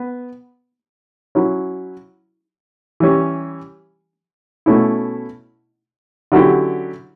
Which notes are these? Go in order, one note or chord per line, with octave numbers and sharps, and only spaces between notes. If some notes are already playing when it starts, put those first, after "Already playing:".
Already playing: B3
F#3 C#4 E4
E3 G3 C#4
B2 A3 C#4 E4
D3 F#3 C#4 E4 G4